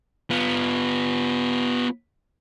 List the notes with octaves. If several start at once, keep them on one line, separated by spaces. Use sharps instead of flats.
B3 F4